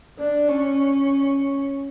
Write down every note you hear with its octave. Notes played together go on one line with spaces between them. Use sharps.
D4
C#4